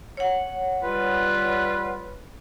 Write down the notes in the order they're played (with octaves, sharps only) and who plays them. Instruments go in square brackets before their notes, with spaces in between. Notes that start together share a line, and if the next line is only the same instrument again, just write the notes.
[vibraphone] C#5 F#5
[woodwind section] G3 F4 B4